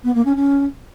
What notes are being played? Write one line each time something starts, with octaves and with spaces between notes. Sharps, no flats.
B3
A#3
C#4
C#4